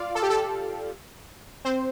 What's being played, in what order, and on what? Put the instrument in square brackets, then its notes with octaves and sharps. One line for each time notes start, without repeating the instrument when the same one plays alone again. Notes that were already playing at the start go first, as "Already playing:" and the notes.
Already playing: [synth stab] F4 D5 F5
A4
G4
A4
C4 C5